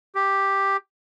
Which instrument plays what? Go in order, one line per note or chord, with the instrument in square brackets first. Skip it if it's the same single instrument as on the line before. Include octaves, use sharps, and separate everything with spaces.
[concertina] G4